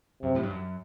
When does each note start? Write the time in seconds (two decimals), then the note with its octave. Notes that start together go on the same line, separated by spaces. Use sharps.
0.22 F#2 C3
0.35 A2
0.43 G2
0.50 F#2